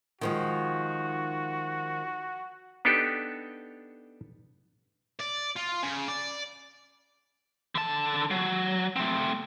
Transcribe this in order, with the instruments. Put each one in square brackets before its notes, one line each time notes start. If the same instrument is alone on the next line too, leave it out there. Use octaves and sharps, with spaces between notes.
[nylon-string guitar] D#3 F3 G#3 [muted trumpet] F#4
[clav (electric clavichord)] B3 D4 D#4 G4 A4
[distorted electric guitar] D5
F4
C#3
D5
[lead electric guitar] D3 A5
F#3
A3 C4